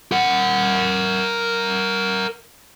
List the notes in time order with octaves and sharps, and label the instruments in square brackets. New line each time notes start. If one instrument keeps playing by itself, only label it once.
[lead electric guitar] A#4 F#5